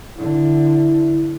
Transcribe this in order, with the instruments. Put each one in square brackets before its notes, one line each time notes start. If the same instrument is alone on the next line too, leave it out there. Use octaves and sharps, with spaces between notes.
[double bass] D3 [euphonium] E4